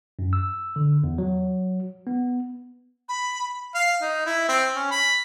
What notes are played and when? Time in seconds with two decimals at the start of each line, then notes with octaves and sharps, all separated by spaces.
0.19 F#2
0.33 E6
0.76 D3
1.04 E2
1.18 F#3
2.07 B3
3.09 B5
3.74 F5
4.01 D#4
4.26 E4
4.48 C4
4.75 C#4
4.91 B5